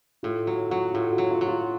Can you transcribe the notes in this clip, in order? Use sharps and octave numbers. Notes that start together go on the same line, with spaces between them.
A2 F4
F#3 F#4
F#3 F#4
A2 F4
F#4
F#3
F4
F#3
F4